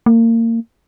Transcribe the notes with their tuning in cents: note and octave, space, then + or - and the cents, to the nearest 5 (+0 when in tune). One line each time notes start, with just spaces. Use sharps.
A#3 -30